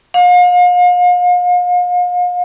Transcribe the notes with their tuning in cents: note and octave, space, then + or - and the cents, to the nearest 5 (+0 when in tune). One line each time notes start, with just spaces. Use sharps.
F5 +40